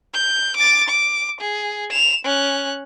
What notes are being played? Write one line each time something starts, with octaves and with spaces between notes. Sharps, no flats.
G6
D6 A6
D6
G#4
E7 F7
C#4 F#6